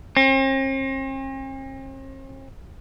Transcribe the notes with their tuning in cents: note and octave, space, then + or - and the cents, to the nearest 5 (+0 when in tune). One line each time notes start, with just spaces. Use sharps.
C4 +45